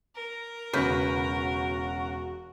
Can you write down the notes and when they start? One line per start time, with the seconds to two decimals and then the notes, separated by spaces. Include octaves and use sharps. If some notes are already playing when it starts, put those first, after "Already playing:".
0.15 A#4
0.73 E1 C#3 F#4 B4 G6 B6